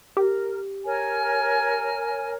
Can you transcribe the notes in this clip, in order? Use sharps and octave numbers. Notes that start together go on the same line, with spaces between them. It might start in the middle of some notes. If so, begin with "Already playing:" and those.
G4 A#4
A#4 C#5 G#5